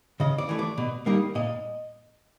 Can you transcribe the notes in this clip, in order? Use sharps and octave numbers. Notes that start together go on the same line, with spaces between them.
C#3 D#5
D5
E3 A3
D5
B2
G3 A#3 D#4
A#2 D#5